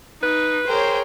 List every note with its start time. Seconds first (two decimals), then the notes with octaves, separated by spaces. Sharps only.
0.23 D#4 B4
0.68 G#4 A#4 C5 C#5 G5